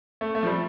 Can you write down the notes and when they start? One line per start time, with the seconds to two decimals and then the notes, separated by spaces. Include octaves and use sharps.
0.21 A3
0.35 A3
0.43 F3
0.46 G3